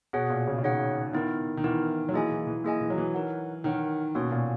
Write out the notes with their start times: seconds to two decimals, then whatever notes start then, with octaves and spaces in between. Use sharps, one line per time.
0.13 B2 G#4 C#5 F#5
0.30 A#2
0.47 C#3
0.58 C#3
0.63 D#3 G#4 C#5 F#5
1.13 D#3 B3 E4 A#4
1.57 D#3
1.64 E3 B3 E4 A#4
2.09 F#3
2.14 E3 A#3 E4 G#4 D#5 G#5
2.31 E3
2.47 E3
2.64 A#3 E4 G#4 D#5 G#5
2.81 E3
2.90 F#3
2.98 E3
3.14 D#4 A#4 C#5 F#5
3.64 D#3 D#4 A#4 C#5 F#5
4.15 B2 A#3 C#4 F#4 C#5
4.31 A#2